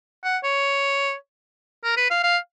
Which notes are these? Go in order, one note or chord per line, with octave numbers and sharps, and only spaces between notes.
F#5
C#5
A#4
B4
F5
F5